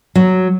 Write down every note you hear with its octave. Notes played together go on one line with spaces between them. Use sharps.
F#3